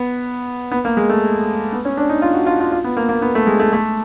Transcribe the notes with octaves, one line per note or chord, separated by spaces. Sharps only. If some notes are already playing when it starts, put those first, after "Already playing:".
Already playing: B3
B3
A#3
G#3
A3
B3
C#4
D4
D#4
F4
F#4
F4
F4
F4
B3
A#3
A#3
B3
A3
G#3
A3
A3